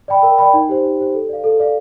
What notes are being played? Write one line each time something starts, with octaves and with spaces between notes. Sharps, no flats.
D5 G5 B5
A#4
D5 G5 B5
D#4
G4 C5
D#4
G4 C5
A4
D5 F5
A4
D5 F5